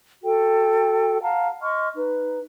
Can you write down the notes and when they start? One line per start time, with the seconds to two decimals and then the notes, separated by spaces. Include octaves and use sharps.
0.23 F#4 A4 G5
1.21 F5 F#5 A5 A#5
1.61 D#5 C6 C#6 F6
1.94 D#4 B4